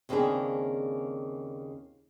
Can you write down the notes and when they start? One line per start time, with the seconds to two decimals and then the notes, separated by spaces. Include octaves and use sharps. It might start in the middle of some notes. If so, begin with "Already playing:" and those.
0.09 D#2 C#3 A#3 C4 D4 G#4